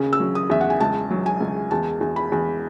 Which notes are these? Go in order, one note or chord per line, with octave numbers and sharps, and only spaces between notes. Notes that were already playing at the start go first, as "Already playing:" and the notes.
Already playing: D#2 C#3
E6
F#3
D#6
E2 E5
F#5
G#5
C#2 A5
F#3
G#5
C#2
E2 A5
E2
B5
E2